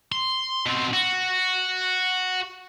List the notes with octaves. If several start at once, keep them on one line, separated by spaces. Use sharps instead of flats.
C6
B2 C4
F#4